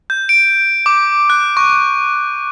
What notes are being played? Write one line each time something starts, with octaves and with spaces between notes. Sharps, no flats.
G6
D7
D6
F#6
C#6